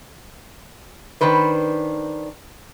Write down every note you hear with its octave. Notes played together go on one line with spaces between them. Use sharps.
D#3 D4 B4 C5